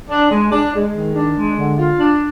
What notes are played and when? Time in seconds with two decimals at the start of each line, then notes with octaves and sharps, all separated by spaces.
0.09 D4
0.30 G#3
0.51 D4
0.73 G#3
0.94 D#3
1.14 D4
1.36 G#3
1.57 D3
1.79 F4
1.99 D4